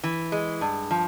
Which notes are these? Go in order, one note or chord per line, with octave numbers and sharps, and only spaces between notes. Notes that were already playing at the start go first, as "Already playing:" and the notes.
E3
G#3
G2
F3